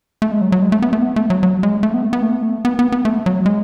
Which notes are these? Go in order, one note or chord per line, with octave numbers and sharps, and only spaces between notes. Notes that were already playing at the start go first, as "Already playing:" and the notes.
A3
G#3
F#3
F#3
G#3
A3
B3
A3
B3
A3
F#3
F#3
G#3
A3
B3
A3
B3
A3
B3
A3
B3
B3
B3
A3
F#3
G#3